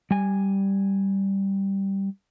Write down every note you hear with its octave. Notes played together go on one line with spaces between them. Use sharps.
G3 G#5